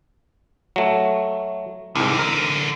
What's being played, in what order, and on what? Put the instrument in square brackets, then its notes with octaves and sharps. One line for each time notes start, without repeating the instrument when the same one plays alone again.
[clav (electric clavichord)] F#3 A3
[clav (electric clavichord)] C2 G#2 [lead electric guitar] D3 E3
[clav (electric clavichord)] A#4